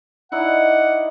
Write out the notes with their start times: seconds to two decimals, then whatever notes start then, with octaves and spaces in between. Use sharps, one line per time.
0.32 D#4 E4 D5 F#5